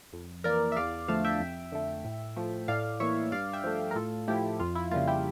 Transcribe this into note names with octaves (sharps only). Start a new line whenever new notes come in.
F2
E3 A#3 A#4 D5
E5
E2 D5 F5
D3 F3 A3 F5 A5
E5 G5
F2
D3 A3
A2
F3 A3
A2 D5 F5
E3 A#3 C#5 E5
G2 D5 F5
E5 G5
F3 A3
A#4
A2 F4 A4
F3 A3 E4 G4
F2 F4
E4
C#3 G3 A#3 F4
E4 G4